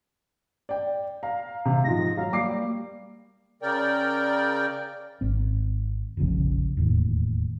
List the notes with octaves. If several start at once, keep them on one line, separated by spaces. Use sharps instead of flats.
D5 G5
F5 A#5
C3
G#2 F3 A#6
F#3 F5
G3 A#3 D6 C7
C#3 A#4 D5 G5
G#1 C4
F1 A#1 C#3 F3
E1 D#2 A2